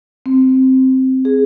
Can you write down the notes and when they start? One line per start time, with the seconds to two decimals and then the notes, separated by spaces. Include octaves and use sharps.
0.26 C4
1.25 G#4